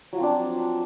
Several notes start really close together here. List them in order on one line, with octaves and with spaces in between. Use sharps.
F#3 F3 C4 D4